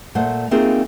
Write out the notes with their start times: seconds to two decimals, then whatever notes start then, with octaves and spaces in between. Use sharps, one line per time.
0.15 A#2 A3 C5 F#5
0.51 A3 A#3 C4 D#4 F4 G#4